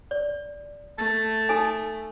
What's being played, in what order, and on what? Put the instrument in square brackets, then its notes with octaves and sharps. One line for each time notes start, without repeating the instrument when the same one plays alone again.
[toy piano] D5
[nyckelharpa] A3 [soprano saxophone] A5
[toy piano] D#4 A4 G#5